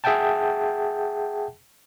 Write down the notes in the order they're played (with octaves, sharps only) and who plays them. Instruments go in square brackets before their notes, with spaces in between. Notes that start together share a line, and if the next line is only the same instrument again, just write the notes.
[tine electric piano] G#4 E5 F#5 G5 A5